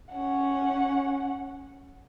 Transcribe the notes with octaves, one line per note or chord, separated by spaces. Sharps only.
C#4 F#5